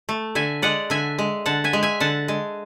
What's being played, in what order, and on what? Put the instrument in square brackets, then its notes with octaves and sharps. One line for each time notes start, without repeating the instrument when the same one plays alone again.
[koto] A3
D3 E5 G#5
G#3 D5 F#5
D3 E5 G#5
G#3
D3 F#5 A5
E5 G#5
G#3
E5 G#5
D3 F#5 A5
G#3